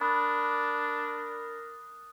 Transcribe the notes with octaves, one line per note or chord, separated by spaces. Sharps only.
D4 A#4 B5 D#6 F#6 A6